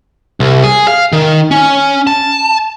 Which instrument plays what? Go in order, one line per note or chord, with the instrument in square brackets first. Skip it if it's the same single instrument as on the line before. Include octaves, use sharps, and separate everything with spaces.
[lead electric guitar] C2
G#4
F5
D#3
C#4
A5